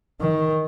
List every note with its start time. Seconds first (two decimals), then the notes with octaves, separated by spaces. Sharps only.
0.21 D#3